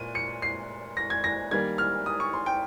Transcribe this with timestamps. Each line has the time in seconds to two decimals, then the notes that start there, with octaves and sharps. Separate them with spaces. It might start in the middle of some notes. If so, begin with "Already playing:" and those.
Already playing: A#2 D#7
0.15 C#7
0.42 C7
0.97 A#6
1.10 G#6
1.24 A#6
1.51 D#3 G3 A#3 G#6
1.78 F6
2.06 D#6
2.20 C#6
2.33 C6
2.46 G5